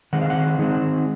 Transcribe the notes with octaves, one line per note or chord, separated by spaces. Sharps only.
D#3 G#3 C4 F#5
F5
F#5
D#3 G#3 C4